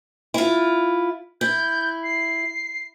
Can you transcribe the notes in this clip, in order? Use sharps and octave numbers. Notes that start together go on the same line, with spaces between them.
E4 F4
E4 G6
C7